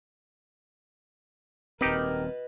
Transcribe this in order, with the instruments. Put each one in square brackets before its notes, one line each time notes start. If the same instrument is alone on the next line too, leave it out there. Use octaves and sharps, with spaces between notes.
[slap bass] D#1 C4 [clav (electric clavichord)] D#4 G4 [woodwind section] A#4 [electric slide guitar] B4 D#5